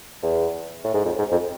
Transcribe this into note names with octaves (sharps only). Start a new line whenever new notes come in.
E2
A2
G#2
F2
G#2
F2